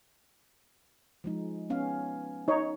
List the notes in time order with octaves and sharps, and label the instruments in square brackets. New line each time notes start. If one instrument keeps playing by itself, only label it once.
[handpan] F3 G#3 D#4
B3 C#4 F5
[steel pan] D#4 C#5